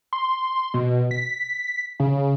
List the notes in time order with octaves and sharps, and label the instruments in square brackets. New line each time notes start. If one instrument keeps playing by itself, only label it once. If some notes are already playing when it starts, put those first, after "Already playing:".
[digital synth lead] C6
B2
B6
C#3